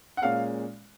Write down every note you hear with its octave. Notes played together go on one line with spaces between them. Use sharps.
F#5
A#2 G#3 C#4 F5